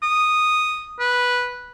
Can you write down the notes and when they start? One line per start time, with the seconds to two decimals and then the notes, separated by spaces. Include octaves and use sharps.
0.03 D#6
0.99 B4